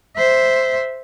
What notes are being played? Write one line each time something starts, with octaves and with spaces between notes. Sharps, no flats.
C5 E5